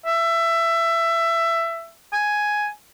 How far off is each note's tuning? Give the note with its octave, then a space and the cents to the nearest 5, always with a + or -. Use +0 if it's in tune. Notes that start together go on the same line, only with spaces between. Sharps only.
E5 +20
G#5 +5